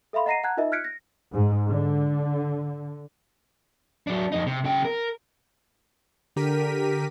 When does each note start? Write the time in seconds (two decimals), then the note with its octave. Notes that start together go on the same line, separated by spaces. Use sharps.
0.13 A4 E5 F5 B5 C6
0.26 D#5 F#5 A#5 A#6 C7 D#7
0.44 F#5 A5 A#5 F#6 G#6
0.57 D#4 F4 A#4 D#5 E5
0.72 F6 F#6 G#6 B6 C#7 D7
0.84 A#6
1.33 G#2
1.68 D3
4.07 F#3 D4
4.32 F2 D#4
4.46 C3
4.65 C#3 G5
4.85 A#4
6.36 D3 G4 A#4 B6 D#7